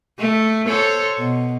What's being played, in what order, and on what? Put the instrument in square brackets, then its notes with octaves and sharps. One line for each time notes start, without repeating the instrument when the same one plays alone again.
[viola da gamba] A3
A4 C5 C#5
B2